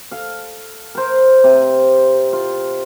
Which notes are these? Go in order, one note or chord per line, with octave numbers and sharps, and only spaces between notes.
A4 F5
A#4 C5
C3
F4